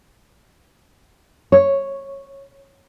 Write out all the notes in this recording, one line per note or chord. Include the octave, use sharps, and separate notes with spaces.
C#5